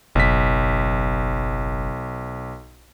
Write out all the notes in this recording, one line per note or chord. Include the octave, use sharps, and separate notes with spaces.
F#1 B1 B6